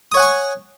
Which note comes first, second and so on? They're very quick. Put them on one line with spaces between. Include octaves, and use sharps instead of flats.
D#6 C#5 F#5 G#5 C#6